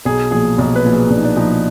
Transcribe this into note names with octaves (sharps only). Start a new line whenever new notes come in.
B1 G#4
A#2 F3 G#4
B1
B4
A#2 F3
G#4
B1 D4
D#4
D4
A#2 F3 D#4